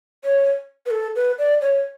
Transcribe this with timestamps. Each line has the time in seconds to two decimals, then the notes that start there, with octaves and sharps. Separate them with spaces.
0.24 C#5
0.86 B4
0.91 A4
1.16 B4
1.39 D5
1.62 C#5